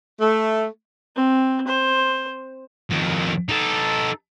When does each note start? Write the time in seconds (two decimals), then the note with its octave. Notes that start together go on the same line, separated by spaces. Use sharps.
0.20 A3
1.16 C4
1.67 C5
2.90 F2 D#3
3.49 D#4 A4